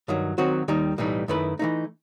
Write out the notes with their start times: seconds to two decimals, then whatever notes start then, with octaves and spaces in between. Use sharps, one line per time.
0.08 G2 D#3 F#3
0.38 D#3 F#3 C4 F#4
0.68 D#2 D#3 G3 D#4
0.98 B1 A2 E3 G3 D#4
1.28 F#2 D#3 A3 E4 B4
1.59 E3 A3 D#4